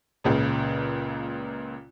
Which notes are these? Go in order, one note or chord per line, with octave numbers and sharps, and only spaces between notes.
C#2 A#2 C#3